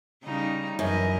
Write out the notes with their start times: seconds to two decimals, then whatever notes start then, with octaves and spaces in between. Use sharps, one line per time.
0.24 C#3 G3 D#4
0.79 F#2 E3 A#4 D#5